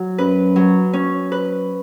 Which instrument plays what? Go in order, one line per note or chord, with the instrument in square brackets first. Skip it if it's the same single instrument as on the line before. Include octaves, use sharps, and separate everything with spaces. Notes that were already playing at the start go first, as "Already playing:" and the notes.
Already playing: [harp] F#3
[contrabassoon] F#2 [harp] B4
[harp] F#3
C#4
B4